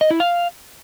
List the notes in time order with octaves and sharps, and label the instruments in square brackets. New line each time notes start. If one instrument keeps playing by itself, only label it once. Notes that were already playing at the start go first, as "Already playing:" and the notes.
[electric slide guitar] D#5
E4
F5